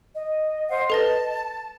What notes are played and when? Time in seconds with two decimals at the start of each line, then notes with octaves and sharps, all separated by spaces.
0.15 D#5
0.70 C5 F5 F#5
0.90 A4 B4 A5 A#6